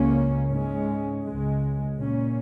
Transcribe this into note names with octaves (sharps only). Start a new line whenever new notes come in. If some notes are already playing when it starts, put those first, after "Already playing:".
Already playing: C#2 C#3 A#3 C#4
G#2 G#3 C#4
C#2 C#3 G#3
A#2 A#3 C#4